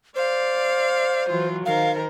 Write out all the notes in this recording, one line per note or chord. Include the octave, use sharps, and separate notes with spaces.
C5 D5 F5
E3 F#3 F4
D#3 A#4 C5 F5